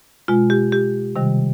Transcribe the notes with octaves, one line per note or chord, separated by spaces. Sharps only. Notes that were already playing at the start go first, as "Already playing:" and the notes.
B2 G#3 F4
G4
G4
C3 D#3 G3